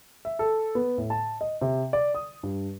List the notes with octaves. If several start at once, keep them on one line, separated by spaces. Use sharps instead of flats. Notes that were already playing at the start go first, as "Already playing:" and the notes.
E5
A4
B3
A2
A5
D#5
C3
D5
D#6
G2